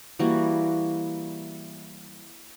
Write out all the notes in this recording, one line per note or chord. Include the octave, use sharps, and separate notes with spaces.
E3 G3 A#3 F#4